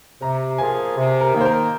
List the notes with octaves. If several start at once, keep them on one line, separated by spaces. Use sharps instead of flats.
C3 A#5
F3 A#3 F4 G#4 G#5
C3
A#4
D#3 A#3
C5
A#4